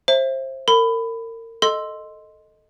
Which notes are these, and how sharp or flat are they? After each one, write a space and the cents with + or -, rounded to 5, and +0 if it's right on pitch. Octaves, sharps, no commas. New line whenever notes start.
C5 +25 E5 +10
A#4 -35 B5 +15
A4 +0 D#5 +0 C6 +0